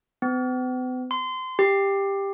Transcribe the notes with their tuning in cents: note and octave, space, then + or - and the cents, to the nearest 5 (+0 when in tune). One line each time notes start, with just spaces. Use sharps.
B3 +45
C6 -25
G4 +10